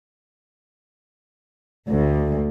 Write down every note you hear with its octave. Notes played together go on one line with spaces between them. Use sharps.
D2